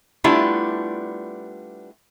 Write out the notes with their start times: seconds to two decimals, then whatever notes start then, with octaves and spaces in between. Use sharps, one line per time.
0.24 G3 A3 B3 D4 E4 F4